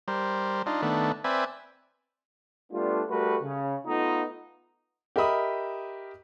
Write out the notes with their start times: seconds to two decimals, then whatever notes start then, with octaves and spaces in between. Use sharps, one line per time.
0.08 G3 A#4 C5
0.66 D4 D#4 F4
0.82 D#3 A3 B3 D4
1.24 C4 B4 D5 E5 G#5
2.72 G3 A3 B3 D4 F4
3.09 G3 A3 F#4 A#4 B4
3.42 C#3
3.87 A3 B3 D#4 F4
5.16 G4 A#4 D#5 E5 B5 D#6